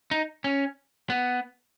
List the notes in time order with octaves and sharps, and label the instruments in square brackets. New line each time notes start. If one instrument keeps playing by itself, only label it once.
[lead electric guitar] D#4
C#4
B3